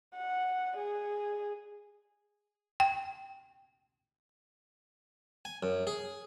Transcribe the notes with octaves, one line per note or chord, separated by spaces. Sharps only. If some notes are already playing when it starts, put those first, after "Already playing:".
F#5
G#4
G5
G#5
F#2
G#4